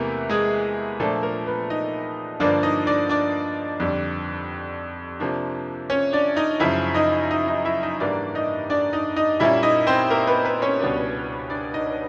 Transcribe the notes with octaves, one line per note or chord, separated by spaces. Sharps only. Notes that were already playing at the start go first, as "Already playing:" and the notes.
Already playing: E2 C3 E3 A3 A#3 A#4
G#3 G#4
A#2 F3 A3 A#3 D4 A4
A#3 A#4
B3 B4
D#4 D#5
G2 D3 F3 A#3 D4 D5
D#4 D#5
D4 D5
D4 D5
F2 D3 G3
C3 F3 A#3 D4
C#4 C#5
D4 D5
D#4 D#5
F#2 C#3 F3 E4 E5
D#4 D#5
D#4 D#5
D#4 D#5
E4 E5
D#4 D#5
G#2 E3 G3 A#3 D4 D5
D#4 D#5
D4 D5
D#4 D#5
D#4 D#5
A#2 G3 A#3 C#4 E4 E5
D#4 D#5
C4 C5
A#3 A#4
B3 B4
B3 B4
C#4 C#5
C#2 B2 G3 B3 D4
D4 D5
D#4 D#5